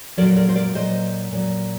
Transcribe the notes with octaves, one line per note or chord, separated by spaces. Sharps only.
A#2 F#3 A#4 D5
A#4 D5
C5
A#4 D5
A#2 F#3 C5 D#5
A#2 F#3